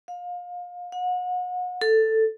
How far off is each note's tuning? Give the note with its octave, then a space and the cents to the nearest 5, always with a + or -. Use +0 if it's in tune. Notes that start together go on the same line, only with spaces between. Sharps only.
F5 +30
F#5 -35
A4 +5